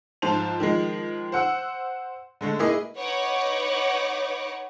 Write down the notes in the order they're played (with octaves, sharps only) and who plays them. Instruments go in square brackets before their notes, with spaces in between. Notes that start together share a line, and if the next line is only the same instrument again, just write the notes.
[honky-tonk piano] G#2 F3 F4 C5 A5 F7
D#3 F3 G#3
C5 F#5 E6
D3 G#3 A3
A#3 E4 G#4 B4 D#5
[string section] D#4 B4 C#5 F#5 C#6 D6